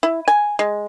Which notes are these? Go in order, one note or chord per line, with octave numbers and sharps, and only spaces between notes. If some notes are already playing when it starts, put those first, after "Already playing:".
E4
G#5
G#3